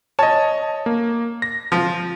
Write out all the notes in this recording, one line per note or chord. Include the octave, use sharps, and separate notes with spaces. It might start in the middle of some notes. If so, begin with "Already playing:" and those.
C#5 D#5 A5
A#3
A#6
F3